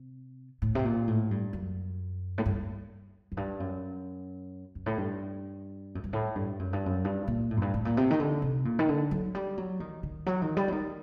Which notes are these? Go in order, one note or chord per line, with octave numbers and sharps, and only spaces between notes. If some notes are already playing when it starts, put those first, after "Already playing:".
Already playing: C3
A2
C3
A#2
A2
G2
F#2
A2
G2
F#2
G2
F#2
F#2
A2
G2
F#2
G2
A2
G2
F#2
G2
F#2
G2
A#2
A2
F#2
G2
A2
A#2
C3
D#3
D3
C3
A#2
D#3
D3
F#3
G3
F#3
D#3
D#3
F#3
D#3
G3
F#3
D#3